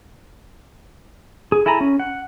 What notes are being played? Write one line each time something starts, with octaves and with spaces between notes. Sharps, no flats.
G#4
E4 A4 G#5 A#5 B5
C#4
F#5